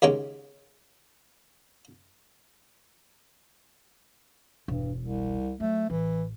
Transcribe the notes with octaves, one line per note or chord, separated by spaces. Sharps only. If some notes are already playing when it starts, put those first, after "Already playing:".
D#2 C#3 G#3 C#4 G5
E1 G2
C2
F#3 A3
A1 E3